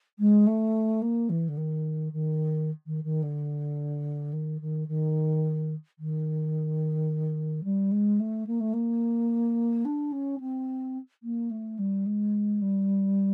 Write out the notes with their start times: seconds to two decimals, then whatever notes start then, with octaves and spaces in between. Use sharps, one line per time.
0.19 G#3
0.47 A3
1.02 A#3
1.30 E3
1.48 D3
1.57 D#3
2.13 D#3
2.86 D#3
3.04 D#3
3.23 D3
4.33 D#3
4.61 D#3
4.88 D#3
5.99 D#3
7.64 G3
7.92 G#3
8.20 A3
8.47 A#3
8.60 A3
8.73 A#3
9.85 D4
10.12 C#4
10.40 C4
11.23 A#3
11.51 A3
11.79 G3
12.06 G#3
12.61 G3